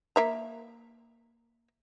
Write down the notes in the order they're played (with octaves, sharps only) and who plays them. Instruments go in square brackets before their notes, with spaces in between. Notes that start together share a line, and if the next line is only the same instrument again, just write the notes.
[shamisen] A#3 E5 A#5